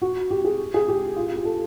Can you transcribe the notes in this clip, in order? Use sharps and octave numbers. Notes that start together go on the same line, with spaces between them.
F#4
G4
G#4
G#4
G4
F4
F4
G4
A4